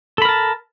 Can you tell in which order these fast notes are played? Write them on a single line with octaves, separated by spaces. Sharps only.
A4 B5 A#4 A5